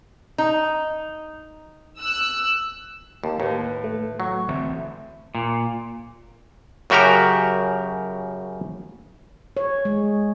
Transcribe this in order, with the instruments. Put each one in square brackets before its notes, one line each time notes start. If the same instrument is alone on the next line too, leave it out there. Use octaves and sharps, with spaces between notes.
[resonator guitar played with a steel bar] D#4
[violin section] E6 F#6
[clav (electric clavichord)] D#2 [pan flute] A5
[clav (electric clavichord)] D#2 [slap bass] A2 [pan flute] B4
[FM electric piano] A3
[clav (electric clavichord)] F#3 [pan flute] C#6
[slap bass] A1 D3 C4 [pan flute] E5
[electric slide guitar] A#2
[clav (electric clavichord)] F#2 C#3 F#4 G4 A#4 A#5
[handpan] C#5
G#3